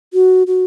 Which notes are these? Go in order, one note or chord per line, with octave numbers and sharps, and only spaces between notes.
F#4
F#4